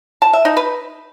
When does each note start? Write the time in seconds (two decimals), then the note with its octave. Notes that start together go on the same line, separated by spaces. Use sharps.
0.22 A5
0.33 E5
0.45 D#4
0.57 B4